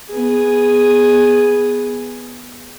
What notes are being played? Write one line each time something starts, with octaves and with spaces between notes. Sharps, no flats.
B3 G#4